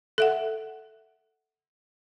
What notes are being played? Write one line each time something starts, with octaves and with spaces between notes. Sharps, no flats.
A4 E5 F#5